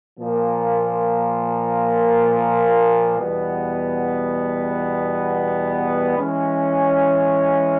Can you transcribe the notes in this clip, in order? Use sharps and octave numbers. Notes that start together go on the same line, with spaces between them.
A#2 F3 A#3
E2 B2 G3 B3
E3 G#3 C#4